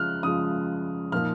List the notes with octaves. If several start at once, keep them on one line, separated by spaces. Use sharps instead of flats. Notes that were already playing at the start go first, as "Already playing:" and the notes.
Already playing: C#3 F3 G#3 F6 F#6
C#3 F3 G#3 D#6
A#2 F3 A#3 D#4 F6